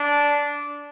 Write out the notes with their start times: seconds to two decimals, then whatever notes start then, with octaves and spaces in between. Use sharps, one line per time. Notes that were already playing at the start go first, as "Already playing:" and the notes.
Already playing: D4